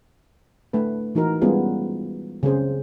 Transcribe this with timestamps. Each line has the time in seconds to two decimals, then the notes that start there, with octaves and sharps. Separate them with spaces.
0.73 A3 D4 B4
1.15 E3 D#4 F#4 A#4
1.42 G3 G#3 B3 C#4 F4 G#4
2.43 C#3 C4 G#4 C5